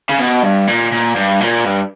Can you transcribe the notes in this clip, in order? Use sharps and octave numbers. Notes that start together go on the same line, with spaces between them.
C#3
B2
G2
A#2
A#2
G2
A#2
G2